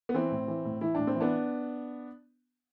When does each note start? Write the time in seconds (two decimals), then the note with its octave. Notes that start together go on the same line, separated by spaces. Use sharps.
0.09 B3
0.14 E3 C4
0.31 A2
0.48 E3
0.65 A2
0.81 E3 E4
0.95 A2 D4
1.07 C4
1.15 E3
1.20 B3 D4